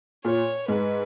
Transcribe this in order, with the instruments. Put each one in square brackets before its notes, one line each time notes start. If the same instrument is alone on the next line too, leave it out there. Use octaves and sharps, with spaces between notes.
[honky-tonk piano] A#2 [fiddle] C#5
[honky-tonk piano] G#2 [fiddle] B4